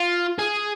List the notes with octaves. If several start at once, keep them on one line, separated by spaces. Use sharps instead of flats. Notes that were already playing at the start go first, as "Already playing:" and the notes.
Already playing: F4
G#4